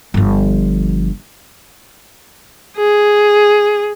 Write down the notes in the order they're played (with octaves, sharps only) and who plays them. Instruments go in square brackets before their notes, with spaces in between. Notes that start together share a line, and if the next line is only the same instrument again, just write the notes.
[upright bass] G1 F3
[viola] G#4